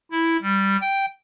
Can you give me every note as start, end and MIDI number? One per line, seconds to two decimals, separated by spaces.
0.12 0.37 64
0.42 0.76 55
0.81 1.06 79